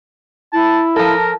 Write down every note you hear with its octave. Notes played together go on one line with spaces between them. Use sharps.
E4 A5
F3 A4 A#4